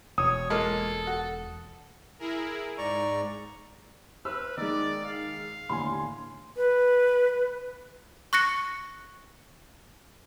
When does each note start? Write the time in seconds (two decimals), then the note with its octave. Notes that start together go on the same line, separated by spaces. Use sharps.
0.18 E1 C#5 D#6
0.50 G#3 A#3 F4 A4
1.07 F#4
2.19 E4 G#4 A#4
2.78 G#2 D5 A#5 C#6
4.25 B4 C5 E6 F6
4.57 D#3 G#3 D#4 D5
5.05 F5
5.69 D#2 A2 D3 G#5 C6
6.56 B4
8.33 C#6 F#6 A#6 C#7